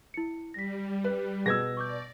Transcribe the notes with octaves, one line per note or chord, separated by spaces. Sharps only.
E4 C#7
G3 A#6 B6
B4
B2 B3 G#4 E6 G#6 A#6
D5 C#6 D6 G6